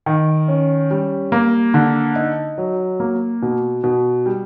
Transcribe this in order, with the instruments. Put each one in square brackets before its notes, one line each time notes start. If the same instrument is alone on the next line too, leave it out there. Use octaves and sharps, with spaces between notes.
[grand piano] D#3
C#4
G3
A#3
D3
D#4
F#3
A#3
B2
B2
G3